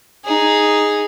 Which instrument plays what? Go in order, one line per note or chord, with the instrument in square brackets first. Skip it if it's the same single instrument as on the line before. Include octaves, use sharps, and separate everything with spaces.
[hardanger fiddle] D#4 G#4